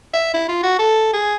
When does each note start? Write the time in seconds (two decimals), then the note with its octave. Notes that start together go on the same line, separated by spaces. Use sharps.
0.14 E5
0.34 E4
0.49 F4
0.63 F#4
0.79 A4
1.13 G#4